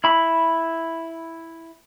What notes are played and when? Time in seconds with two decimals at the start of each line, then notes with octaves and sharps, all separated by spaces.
0.04 E4 B5